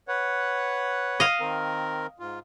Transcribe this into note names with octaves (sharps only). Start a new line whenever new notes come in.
B4 C#5 F#5
D#5 F5
D#3 C4 A#4
G#2 F4